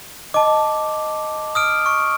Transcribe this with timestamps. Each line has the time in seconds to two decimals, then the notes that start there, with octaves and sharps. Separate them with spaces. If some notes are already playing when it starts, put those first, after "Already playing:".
0.34 D#5 A5 D6
1.55 D#6 F6 D7
1.86 C#6